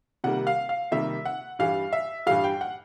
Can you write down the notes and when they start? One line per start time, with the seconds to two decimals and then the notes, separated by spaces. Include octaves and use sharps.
0.24 C3 D#3 G3 A#3 F#5
0.47 F5
0.69 F5
0.92 C3 D#3 G3 A#3 E5
1.25 F#5
1.59 G2 E3 G3 F5
1.93 E5
2.27 G2 E3 G3 F5
2.44 G5
2.61 F#5